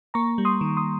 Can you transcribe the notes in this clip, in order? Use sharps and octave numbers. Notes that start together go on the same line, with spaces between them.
A#3 A#5 C#6
G3
C6 D#6
D#3
C6 D#6